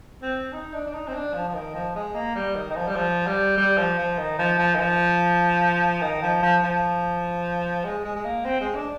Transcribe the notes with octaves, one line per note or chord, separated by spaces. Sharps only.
C4
D#4
D4
D4
D#4
C4
D4
F3
F3
D#3
F3
G#3
A#3
G3
D#3
D#3
F3
G3
F3
G3
G3
F3
F3
D#3
F3
F3
D#3
F3
D#3
F3
F3
F3
G#3
G#3
G#3
A#3
C4
G#3
D4